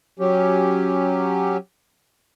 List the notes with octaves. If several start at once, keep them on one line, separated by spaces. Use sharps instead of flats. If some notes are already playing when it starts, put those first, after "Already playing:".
F#3 C#4 G4